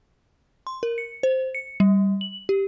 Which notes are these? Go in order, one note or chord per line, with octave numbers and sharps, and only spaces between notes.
C6
A#4
C#7
C5
C#7
G3
F#7
G4